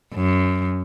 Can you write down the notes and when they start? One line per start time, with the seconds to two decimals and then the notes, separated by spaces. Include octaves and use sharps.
0.15 F#2